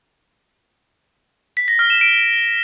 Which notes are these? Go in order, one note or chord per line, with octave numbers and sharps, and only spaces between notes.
B6
A#6
F6
E7
D7